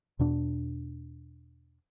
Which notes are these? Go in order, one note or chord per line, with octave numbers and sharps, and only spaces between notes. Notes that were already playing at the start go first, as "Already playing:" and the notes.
E2 B2 D4